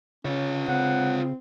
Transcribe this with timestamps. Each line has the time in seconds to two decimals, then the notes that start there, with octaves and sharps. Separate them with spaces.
0.25 C#3 C#4 F4 C#5
0.68 C#3 C4 F#5